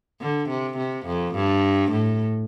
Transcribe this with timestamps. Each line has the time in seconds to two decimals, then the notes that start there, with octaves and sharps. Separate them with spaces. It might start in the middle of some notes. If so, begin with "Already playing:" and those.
0.21 D3
0.49 C3
0.78 C3
1.06 F2
1.35 G2
1.91 A2